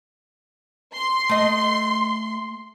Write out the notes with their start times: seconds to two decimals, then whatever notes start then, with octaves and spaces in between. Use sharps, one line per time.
0.95 C6
1.29 A3 D#5